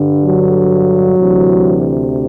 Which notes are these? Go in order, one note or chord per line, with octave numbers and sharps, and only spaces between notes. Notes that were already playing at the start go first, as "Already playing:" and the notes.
Already playing: G2 D3
F#3
D2 C3 E3